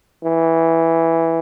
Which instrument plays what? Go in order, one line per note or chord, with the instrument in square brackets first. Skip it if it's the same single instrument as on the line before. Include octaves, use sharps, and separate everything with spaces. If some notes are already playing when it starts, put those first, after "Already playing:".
[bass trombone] E3